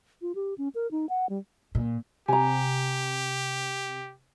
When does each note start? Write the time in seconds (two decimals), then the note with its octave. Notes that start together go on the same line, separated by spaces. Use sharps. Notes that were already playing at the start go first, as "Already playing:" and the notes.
0.22 F4
0.35 G4
0.58 C#4
0.75 A#4
0.91 D#4
1.09 F#5
1.29 G3
1.75 A#2
2.28 C3 G4 G#5 A#5